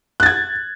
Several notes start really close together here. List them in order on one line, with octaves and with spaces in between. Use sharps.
F#6 A6 G#6